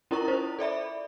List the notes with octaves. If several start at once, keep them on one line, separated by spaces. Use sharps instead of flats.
C#4 E4 F4 A#4 A#5 C#6
E4 C5
A4 D5 E5 B5